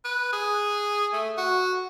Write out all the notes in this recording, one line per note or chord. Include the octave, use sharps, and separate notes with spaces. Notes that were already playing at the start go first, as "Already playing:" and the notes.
B4
G#4
A3
F#4